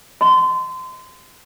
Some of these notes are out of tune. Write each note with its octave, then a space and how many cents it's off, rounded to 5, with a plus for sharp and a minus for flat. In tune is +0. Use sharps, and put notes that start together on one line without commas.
D#5 +0 C6 -30